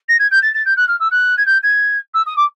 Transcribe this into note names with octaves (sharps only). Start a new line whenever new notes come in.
A#6
G#6
G6
A6
A6
G6
F#6
F6
E6
F#6
G#6
G6
G#6
E6
D#6
D6